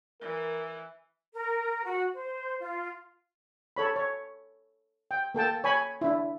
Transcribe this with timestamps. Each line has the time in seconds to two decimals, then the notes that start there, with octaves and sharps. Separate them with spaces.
0.21 E3 A#4
1.34 A#4
1.84 F#4
2.14 C5
2.60 F4
3.76 A4 C#5 B5
3.96 C#5
5.11 G5
5.35 A#3 A4 G5 A5
5.64 C#5 G#5 B5
6.01 D4 E4